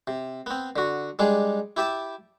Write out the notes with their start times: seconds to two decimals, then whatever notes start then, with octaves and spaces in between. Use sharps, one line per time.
0.07 C3
0.46 B3 C4
0.76 D3 F#4
1.19 G3 G#3 D4 G#4
1.77 E4 G4 E5 A5